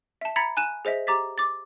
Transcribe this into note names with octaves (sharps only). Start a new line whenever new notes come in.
E5 A5
A#5 B5 G#6 A6 B6 C#7
G#5 F#6 D#7 E7
G#4 C5 D#5 E5
G4 A#5 D6 A6 B6
D6 A6